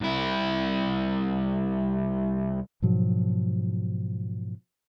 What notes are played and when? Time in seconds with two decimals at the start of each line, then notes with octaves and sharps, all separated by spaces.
0.01 C2 E4
2.82 G#2 B2 F3 F#3